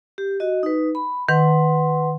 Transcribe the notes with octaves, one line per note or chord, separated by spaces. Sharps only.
G4
F#4 D#5
D#4 B4
B5
D#3 B4 F#5 C6